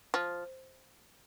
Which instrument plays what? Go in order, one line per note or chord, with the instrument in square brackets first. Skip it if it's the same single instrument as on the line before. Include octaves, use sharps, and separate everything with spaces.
[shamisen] F3